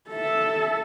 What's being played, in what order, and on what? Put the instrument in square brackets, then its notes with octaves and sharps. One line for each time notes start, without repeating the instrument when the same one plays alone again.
[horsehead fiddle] A4 E5